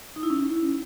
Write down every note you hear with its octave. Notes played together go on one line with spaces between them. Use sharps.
D#4
E4
C#4